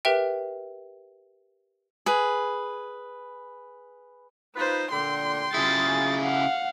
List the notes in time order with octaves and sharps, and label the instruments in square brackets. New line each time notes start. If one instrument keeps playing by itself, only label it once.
[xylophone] G4 A#4 B4 E5 G5
[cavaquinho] G#4 B4
[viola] D#4 C5 [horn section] F4 B4
[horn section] A#2 D3 [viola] G5 C6
[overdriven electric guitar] C#3 E4 [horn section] F#3 F4 G#4 [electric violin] A6
[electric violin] F5 F#5